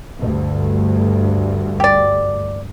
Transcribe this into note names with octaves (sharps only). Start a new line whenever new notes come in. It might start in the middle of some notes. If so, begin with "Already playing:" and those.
D2 G2
G4 D5